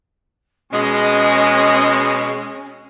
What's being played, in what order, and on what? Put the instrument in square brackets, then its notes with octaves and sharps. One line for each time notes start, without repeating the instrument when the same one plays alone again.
[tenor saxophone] B2 [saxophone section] G#3 [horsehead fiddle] C#4 [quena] D#5